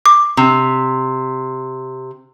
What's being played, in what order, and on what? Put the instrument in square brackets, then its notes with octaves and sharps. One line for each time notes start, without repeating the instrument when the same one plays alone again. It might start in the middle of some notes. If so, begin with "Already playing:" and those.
[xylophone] D6
[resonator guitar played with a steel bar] C3